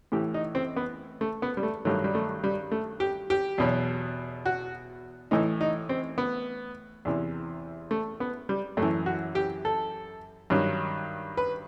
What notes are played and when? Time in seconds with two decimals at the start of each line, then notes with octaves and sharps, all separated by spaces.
0.12 A2 E3 G4
0.34 D#4
0.55 C4
0.76 B3
1.21 A3
1.42 B3
1.57 G3
1.63 A3
1.85 G2 D#3 F#3 A3
2.04 G3
2.15 A3
2.44 G3
2.71 A3
3.00 G4
3.30 G4
3.58 E2 B2 F#3
4.46 F#4
5.31 A2 E3 D#4
5.61 D#4
5.89 C4
6.18 B3
7.05 E2 C3 E3
7.91 A3
8.20 B3
8.49 G3
8.77 F#2 A3
8.82 E3
9.06 F#4
9.35 G4
9.65 A4
10.50 G2 D#3 F#3
11.37 B4